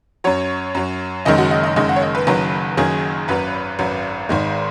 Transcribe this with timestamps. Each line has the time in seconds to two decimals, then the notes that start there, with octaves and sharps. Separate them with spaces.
0.24 F#2 F#3 C#5
0.75 F#2 F#3
1.25 F#1 F#2 D#3 G#3 D#5
1.38 F#4
1.51 D#5
1.63 D#5
1.76 F#1 F#2 D#3 G#3 D#5
1.89 F#5
1.96 C#5
2.02 D#5
2.15 B4
2.27 F#1 F#2 D#3 F#3 B4
2.77 F#1 F#2 D#3 F#3 G#4
3.28 G#1 F#2 F#3 B4
3.79 G#1 F#2 F#3
4.29 G#1 G#2 D#3 G#3